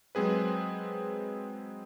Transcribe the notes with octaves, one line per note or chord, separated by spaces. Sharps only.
F#3 G#3 C4 G#4 B4